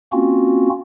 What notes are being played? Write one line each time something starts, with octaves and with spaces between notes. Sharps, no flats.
A#3 C4 C#4 F4 F#4